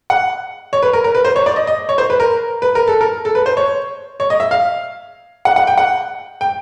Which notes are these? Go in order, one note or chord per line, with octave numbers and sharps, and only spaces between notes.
F#5
C#5
B4
A#4
A#4
B4
C5
C#5
D5
D#5
D#5
C#5
C5
B4
A#4
B4
A#4
A4
A#4
A4
B4
C5
C#5
C#5
D#5
E5
F5
F#5
F#5
G5
F#5
G5